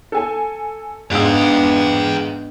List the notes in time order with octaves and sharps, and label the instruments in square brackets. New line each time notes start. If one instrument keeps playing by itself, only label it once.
[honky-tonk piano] A4 G#5
[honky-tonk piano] G#2 G#3 D#6 [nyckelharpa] B3 D4 [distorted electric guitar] F5 G5